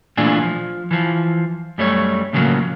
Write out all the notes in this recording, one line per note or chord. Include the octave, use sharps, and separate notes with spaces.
A#2 E3 A3 D4 F4 G#4
F3
E3 F3
F#2 G3 A3 C#5
A2 C#3 F3 F#3 A#3